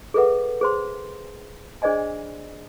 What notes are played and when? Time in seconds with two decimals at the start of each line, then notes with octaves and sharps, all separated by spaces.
0.14 G#4 A4 B4 E5 F#5
0.61 G#4 C5 C6
1.82 D4 G#4 C5 D5 D#5 G#5